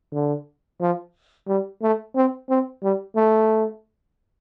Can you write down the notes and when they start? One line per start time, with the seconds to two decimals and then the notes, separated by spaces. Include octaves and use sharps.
0.13 D3
0.81 F3
1.48 G3
1.82 A3
2.16 C4
2.50 C4
2.83 G3
3.16 A3